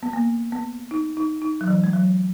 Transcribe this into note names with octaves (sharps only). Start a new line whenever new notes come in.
B3
A#3
B3
D#4
D#4
D#4
F#3
E3
G#3
F#3